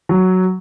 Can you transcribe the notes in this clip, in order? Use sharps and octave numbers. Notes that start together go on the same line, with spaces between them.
F#3